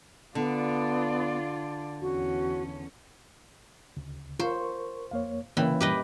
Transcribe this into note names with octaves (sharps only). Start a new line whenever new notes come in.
D3 B3 F4 D5
E2 C#4 F#4
D2 C#3
F4 A#4 C5 C#6
F2 A#3 C#5 F5
C#3 E3 A#3 C#4 G5
F#2 A#2 G3 G4 B4 D#5